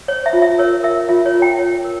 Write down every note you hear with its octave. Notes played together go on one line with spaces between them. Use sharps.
C5 C#5
E5
F4
E5
A#4 C#5
A#4 E5
F4 E5
C#5
F4
G5
C#5
A#4